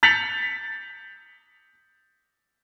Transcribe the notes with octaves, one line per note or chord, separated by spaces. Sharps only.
G6 A6 B6 C#7 F7 F#7